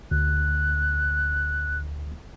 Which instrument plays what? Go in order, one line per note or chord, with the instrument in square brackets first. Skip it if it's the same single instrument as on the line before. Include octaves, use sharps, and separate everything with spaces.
[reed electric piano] D2 [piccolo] F#6